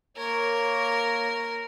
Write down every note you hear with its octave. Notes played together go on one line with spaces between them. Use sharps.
A#3 A#4 C#5